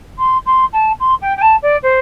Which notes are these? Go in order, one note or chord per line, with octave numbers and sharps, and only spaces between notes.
C6
C6
A5
C6
G5
G5
A5
D5
C5